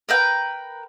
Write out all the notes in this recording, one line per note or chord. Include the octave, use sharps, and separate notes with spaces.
A#4 B4 G5